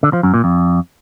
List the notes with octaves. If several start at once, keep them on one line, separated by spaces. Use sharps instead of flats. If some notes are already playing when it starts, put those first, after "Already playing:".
D3
F3
F#2
A#2
F2